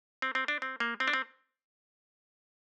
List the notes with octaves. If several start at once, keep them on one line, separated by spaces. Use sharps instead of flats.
C4
C4
D4
C4
A#3
C4
D4
C4